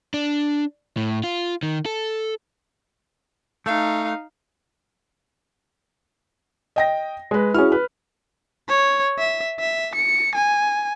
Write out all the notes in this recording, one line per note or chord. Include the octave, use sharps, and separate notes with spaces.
D4
A2
F4
D#3
A4
A3 D#4 F5
D#5 G5 A#6
G#3 B4
C#4 E4 F#4 G#4 F6
B4
C#5
E5
E5
C#7
G#5